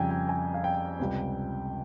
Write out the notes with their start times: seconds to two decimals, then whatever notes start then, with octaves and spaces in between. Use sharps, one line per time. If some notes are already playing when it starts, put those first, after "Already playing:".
Already playing: F2 C#3 G3 G5 G#5 A#5
0.11 G5
0.29 G#5
0.54 F5
0.64 G5
1.00 C#2 C3 G3